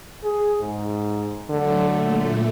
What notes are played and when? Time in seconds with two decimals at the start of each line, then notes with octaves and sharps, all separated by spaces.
0.24 G#4
0.60 G#2
1.50 D3 F#3 A3
1.89 A#2 A3